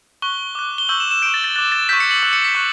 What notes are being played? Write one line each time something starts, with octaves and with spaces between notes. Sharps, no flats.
C#6 F#6 G7
D6 F#6
G7
C#6 E6 G6 F#7
E7
E7
C#6 G6 D7
A6
A6
D6 F#6 A6
A6
C#6 E6 G6 B6
C#7
F#7
D6 F#6 F#7
C#7
B6
C#6 F#6